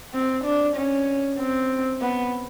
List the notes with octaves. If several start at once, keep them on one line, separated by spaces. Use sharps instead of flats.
C4
D4
C#4
C4
B3